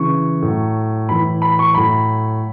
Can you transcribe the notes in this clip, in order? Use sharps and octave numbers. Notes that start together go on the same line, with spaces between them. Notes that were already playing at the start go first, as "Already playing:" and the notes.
Already playing: C#3 E3 C#6
A2 F#3
A2 E3 B5
B5
C#6
A2 F#3 B5